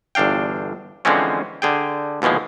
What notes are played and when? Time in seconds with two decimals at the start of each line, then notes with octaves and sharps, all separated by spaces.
0.15 G1 E2 D4 F5 G5
1.05 D3 E3 F3 G#3 C4 C#4
1.62 D3 G#4 G5
2.22 D#2 B2 E3 F3 G#3